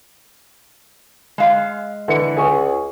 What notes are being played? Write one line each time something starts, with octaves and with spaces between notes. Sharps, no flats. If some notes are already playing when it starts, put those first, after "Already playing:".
G#3 F5
D3 E3 C#7
C#2 G#4 G#5 C#6